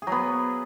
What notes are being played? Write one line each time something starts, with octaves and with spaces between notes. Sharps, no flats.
F#3 B3 G#4